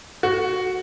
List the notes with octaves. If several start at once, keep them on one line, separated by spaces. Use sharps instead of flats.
F#4